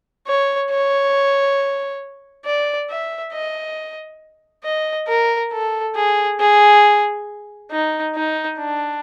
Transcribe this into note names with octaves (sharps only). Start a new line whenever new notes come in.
C#5
C#5
D5
E5
D#5
D#5
A#4
A4
G#4
G#4
D#4
D#4
D4